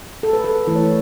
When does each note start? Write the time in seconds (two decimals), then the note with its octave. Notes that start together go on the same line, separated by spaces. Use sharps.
0.23 A4
0.33 B4
0.44 A4
0.67 E3 A3 E4 B4
0.76 C#5
0.83 B4